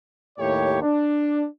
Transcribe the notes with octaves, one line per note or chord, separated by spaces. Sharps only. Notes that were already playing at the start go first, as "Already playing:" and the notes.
D#2 A2 G4 C#5
D4